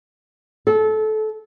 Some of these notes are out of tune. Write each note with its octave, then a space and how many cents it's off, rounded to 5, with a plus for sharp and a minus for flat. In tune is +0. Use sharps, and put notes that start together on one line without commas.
A4 -25